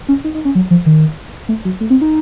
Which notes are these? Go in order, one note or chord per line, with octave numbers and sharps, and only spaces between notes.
C#4
D#4
D#4
C#4
F#3
F3
D#3
A3
F#3
A3
C4
D#4